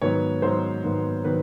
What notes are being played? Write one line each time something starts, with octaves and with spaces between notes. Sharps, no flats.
G#2 D#3 F#3 B3 C#5
G#2 D#3 F#3 B3 C5
G#2 D#3 F#3 B3
D#3 F#3 B3 B4